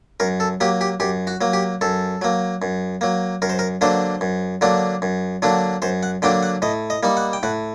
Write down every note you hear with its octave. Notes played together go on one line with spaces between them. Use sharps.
F#2 A#4
A4
F#3 A#3 G4
G4
F#2 G4
F#4
F#3 A#3
G4
F#2 A4
F#3 A#3
F#2
F#3 A#3
F#2 A#4
C5
A#4
D3 F#3 A#3 D4 C5
F#2
D3 F#3 A#3 D4
F#2
D3 F#3 A#3 D4
F#2 C5
F#5
D3 F#3 A#3 D4 G5
F#5
A2 D#5
D#5
G3 A#3 D#4
F#5
G5
A2 F#5